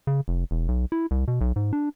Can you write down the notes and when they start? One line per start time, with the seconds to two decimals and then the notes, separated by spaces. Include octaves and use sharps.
0.07 C#3
0.28 F1
0.51 E1
0.68 B1
0.92 E4
1.11 C2
1.28 B2
1.41 B1
1.56 G#2
1.73 D4